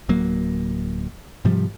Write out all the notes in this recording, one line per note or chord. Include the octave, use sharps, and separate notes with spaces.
D1 F#3 A#3
G#2 C3 F3 G3